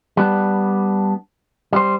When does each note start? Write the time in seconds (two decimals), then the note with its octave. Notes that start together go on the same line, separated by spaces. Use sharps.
0.17 G3 B3 D4
1.73 G3 C5